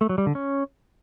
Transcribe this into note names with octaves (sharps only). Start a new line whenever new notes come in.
A3
F#3
G3
D3
C#4